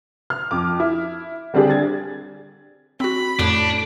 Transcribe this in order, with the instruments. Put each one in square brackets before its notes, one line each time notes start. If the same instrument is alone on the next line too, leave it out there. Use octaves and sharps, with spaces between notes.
[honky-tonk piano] F6
F2 D6
E4
D3 G3 C4 D4 G4 G#4
G#6 A6
[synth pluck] C4 F#4 [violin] B5
[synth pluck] F2 [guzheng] A2 [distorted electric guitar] D4